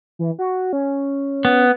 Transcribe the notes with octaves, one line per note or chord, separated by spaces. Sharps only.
E3
F#4
C#4
B3